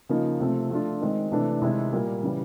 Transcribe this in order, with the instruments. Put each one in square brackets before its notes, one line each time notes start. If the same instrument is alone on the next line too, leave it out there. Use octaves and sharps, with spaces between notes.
[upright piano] C#3 F3 A#3 D#4
C3 F3 A3 C4
F3 A3 D4 F4
D#3 G#3 C4
C3 E3 A3 D4
C3 D#3 G#3 C4 E4
A#2 G3 A#3
C#3 E3 G3